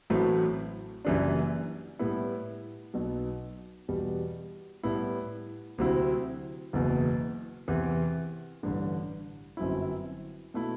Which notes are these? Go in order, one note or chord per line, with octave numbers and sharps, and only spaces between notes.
A1 A2 F#3 A3 C4
F#1 F#2 E3 G3 D4
A2 G3 B3 E4
B1 B2 F#3
E2 B2 G3
A2 G3 B3 E4
D2 C3 F#3 C4 E4
F#1 E2 B2
E2 C3 E3
A1 G2 D3
G1 F#2 F#3 C4 E4
B2 A3 E4